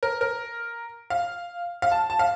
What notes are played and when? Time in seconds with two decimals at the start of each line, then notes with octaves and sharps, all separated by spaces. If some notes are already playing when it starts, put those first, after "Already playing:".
0.03 A#4
0.21 A#4
1.10 F5
1.82 F5
1.92 A5
2.10 A5
2.19 F5